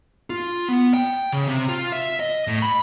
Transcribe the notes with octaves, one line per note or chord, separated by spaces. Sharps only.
F4
B3
G5
C#3
C3
F4
E5
D#5
A2
B5